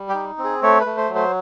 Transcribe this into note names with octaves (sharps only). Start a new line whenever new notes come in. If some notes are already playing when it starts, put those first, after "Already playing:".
Already playing: G3
G4
D#4
C4
G#4
A3 C#5
B4
A3
C5
F#3
C5